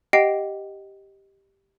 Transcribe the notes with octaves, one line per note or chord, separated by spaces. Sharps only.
G4 D#5 F#5 G5 C7 D7